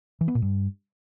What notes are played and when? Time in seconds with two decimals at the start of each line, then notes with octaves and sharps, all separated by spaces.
0.21 E3
0.28 B3
0.35 A#2
0.42 G2